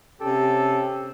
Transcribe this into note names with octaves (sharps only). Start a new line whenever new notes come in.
C3 C#4 G4 A4